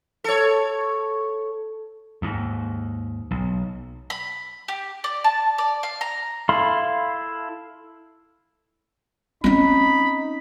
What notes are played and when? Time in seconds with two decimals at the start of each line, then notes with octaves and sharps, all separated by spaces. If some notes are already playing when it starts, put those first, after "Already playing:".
0.24 A4 C#5
2.22 D#2 G#2
3.31 B1
4.10 B5
4.68 G4
5.04 D5
5.24 A5
5.58 D5
5.83 F5
6.01 A#5
6.49 E4 A4 F5 B5 C6
9.44 C4 C#4 D#4 B5